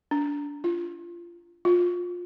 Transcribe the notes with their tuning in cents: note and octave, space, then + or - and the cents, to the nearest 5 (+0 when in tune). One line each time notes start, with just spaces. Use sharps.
D4 -25
F4 -25
F4 +20